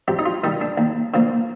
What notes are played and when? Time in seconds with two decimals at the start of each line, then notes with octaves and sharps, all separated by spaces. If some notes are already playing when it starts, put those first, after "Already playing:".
0.08 F2 G4
0.19 D#4
0.26 F4
0.44 D#3 G3 D#4
0.61 D4
0.78 D#2
1.14 D3 F3 A#3